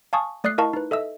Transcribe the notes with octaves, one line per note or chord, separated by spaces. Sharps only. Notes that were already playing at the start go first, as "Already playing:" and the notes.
F5 G#5 A5 C#6 D#6
A3 D5 D#6 F#6 C7
E4 A#4 D#5 F5 A5 C#6
D#4 B4
A4 D#5 E5 E6